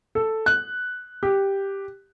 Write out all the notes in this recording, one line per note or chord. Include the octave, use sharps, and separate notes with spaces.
A4
F#6
G4